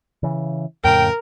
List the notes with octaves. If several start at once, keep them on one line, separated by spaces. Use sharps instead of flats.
C#3 E3
F2 A2 C#3 A#4 G5